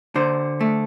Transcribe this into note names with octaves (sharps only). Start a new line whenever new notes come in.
D3 C5
A3